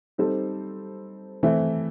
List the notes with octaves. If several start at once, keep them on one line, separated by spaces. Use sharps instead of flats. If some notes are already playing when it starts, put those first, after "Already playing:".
G3 C4 D#4 A4 C5
E3 A3 C4 E4